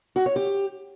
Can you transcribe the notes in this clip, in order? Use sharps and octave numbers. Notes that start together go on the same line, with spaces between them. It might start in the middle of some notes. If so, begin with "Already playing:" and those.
F#4
C#5
G4